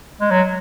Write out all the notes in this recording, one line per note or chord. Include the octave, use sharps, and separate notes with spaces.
G#3
F#3